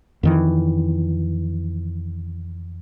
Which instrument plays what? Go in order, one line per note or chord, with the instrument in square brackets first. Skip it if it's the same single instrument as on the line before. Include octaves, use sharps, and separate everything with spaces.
[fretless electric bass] F2 D#3 E3